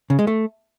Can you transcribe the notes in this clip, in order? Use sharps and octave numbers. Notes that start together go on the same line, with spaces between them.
C#3
G#3
A3